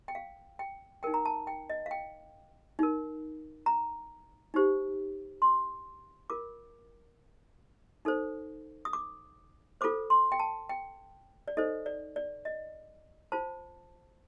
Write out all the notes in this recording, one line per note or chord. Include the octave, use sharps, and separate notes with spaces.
G5
F5
G5
D#4 A#4 G5
A#5
A5
G5
D#5
F5
G5
D#4 A#4
A#5
D#4 G4 C5
C6
F4 A#4 D6
D#4 A4 C5
D#6
D6
F4 A4 C5 D6
C6
G5
A5
G5
D5
D#4 A4 C5 D#5
D5
D5
D#5
F4 C5 A5